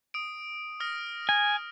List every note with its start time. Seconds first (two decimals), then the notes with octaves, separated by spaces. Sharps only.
0.14 D#6 D7
0.80 D#6 F6 A#6
1.29 G#5